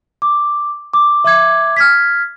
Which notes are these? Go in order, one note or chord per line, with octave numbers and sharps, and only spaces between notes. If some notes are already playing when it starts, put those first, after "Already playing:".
D6
D6
E5 D6 G#6
F6 G#6 B6